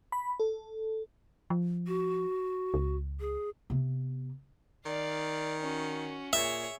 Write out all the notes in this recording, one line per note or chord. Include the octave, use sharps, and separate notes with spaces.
B5
A4
F3
F#4
C#2
G#4
C3 B3
D#3 D5 F5
C#4 F#4
A#2 G#4 C#5 E5